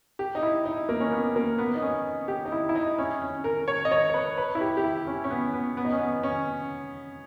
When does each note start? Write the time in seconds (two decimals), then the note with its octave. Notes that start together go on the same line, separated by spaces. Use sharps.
0.19 G4
0.35 D#4
0.42 E4
0.65 D#4
0.89 A#3
1.00 C#4
1.12 B3
1.36 A#3
1.58 B3
1.75 D#4
1.82 C#4
2.28 G4
2.45 D#4
2.52 E4
2.69 E4
2.75 D#4
2.98 C#4
3.22 C#4
3.44 A#4
3.68 C#5
3.85 D#5
3.91 C#5
4.09 C#5
4.14 B4
4.38 B4
4.55 E4
4.61 G4
4.77 G4
4.84 E4
5.07 C#4
5.24 C#4
5.31 B3
5.53 B3
5.77 B3
5.85 D#4
5.92 C#4
5.99 B3
6.23 C#4